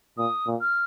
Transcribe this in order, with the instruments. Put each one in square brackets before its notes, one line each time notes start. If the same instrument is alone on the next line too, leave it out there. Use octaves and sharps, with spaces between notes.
[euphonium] A#2 [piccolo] D#6
[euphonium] A#2
[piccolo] F6